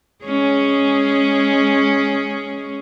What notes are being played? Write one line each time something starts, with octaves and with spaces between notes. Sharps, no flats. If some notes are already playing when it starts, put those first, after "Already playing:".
G#3 C#4 G#4